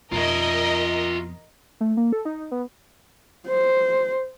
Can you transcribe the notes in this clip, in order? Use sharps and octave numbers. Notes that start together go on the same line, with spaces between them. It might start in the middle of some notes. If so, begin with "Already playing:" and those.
F2 B2 F4 A#4 D#5 E5
A3
A#3
A4
D#4
B3
C5